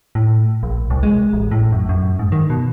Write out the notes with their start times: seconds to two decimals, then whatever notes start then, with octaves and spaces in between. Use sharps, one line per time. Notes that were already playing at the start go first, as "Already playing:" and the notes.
0.15 A2
0.63 A#1
0.90 C2
1.03 G#3
1.33 A1
1.51 A2
1.72 F#2
1.89 F#2
2.19 G#2
2.32 D#3
2.50 B2